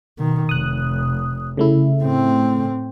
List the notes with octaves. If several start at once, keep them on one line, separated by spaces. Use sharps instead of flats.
B2 D#3
F1 D#6 F#6
C#3 A3 E4
A2 C4